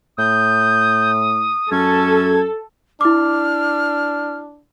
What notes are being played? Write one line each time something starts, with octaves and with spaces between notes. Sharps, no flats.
A2 D#6 G6
F#2 C#4 A4 G#6
D4 E4 D6 F6